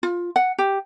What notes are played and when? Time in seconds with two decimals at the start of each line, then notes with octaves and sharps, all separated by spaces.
0.03 F4
0.36 F#5
0.58 G4